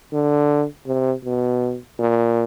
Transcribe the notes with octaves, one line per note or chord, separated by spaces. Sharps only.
D3
C3
B2
A#2